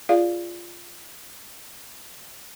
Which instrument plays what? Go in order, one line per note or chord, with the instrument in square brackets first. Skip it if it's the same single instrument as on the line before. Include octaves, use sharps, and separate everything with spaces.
[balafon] F4 G#4 D5 F5